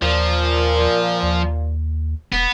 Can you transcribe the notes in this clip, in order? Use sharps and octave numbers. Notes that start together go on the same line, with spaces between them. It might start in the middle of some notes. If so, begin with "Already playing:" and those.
D#2 A#2 F3
D#2
E1 B3